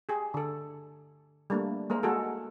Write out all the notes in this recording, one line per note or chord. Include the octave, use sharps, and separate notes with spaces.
G4 G#4
D3 A4
G3 A3 A#3 D4
G#3 A#3 A#4 C5
G#3 F#4 G#4 A4